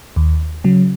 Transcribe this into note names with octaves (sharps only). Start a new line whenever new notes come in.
D#2
C#3 F#3